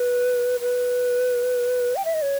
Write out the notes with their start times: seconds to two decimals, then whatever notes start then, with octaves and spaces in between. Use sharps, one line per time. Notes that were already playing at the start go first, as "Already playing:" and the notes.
Already playing: B4
0.61 B4
1.96 G5
2.05 E5
2.14 D#5
2.22 C#5